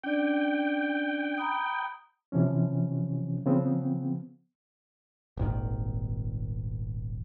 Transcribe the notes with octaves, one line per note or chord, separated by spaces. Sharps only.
C#4 D4 D5 G5
A#5 B5 D#6
C3 E3 F3 C#4
C#3 F3 B3 C4
D#1 G#1 D#3